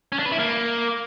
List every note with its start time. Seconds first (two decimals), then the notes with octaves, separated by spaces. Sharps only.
0.12 C#4
0.19 D4
0.26 B4
0.32 E4
0.39 A#3